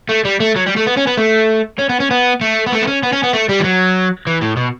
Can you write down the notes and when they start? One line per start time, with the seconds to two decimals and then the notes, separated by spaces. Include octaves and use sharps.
0.09 A3
0.25 G3
0.40 A3
0.56 F#3
0.66 G3
0.76 A3
0.86 B3
0.97 C#4
1.07 B3
1.17 A3
1.79 C#4
1.89 B3
2.00 C#4
2.11 B3
2.41 A3
2.66 B3
2.72 A3
2.82 B3
2.87 C#4
3.03 B3
3.13 C#4
3.23 B3
3.33 A3
3.49 G3
3.60 E3
3.64 F#3
4.27 E3
4.41 A2
4.57 B2